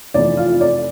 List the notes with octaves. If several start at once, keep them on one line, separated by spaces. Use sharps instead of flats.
F1 F2 E3 D5
F4
D5